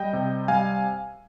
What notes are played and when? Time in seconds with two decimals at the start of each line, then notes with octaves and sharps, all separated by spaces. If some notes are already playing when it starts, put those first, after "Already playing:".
Already playing: G3 D#5 G5
0.13 C3
0.48 G3 F5 G#5